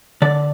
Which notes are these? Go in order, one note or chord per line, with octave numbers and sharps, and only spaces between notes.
D3 D5